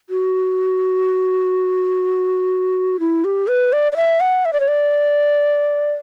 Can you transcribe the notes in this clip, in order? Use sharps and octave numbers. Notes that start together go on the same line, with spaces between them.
F#4
E4
G4
B4
D5
D5
E5
F#5
E5
D5
C#5
D5